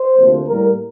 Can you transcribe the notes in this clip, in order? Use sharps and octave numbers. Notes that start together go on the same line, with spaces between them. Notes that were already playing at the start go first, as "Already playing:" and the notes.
Already playing: C5
D2 C3 F3 A#3
A2 G3 A#3 A#4